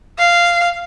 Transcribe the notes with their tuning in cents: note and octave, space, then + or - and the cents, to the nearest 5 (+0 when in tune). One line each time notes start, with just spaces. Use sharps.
F5 -10